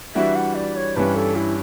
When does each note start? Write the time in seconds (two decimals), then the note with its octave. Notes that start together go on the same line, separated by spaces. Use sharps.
0.15 E3 G3 D4 F#4 E5
0.36 F#5
0.55 D5
0.76 C#5
0.96 G2 E3 G3 C#4 B4
1.16 A4
1.36 E4